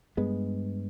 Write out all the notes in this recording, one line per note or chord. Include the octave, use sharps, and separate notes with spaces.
G2 G#3 B3